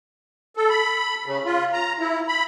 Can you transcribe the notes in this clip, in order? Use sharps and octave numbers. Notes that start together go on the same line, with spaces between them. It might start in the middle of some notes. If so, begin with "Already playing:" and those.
A4
B5
C#3
F4
A#5
E4
B5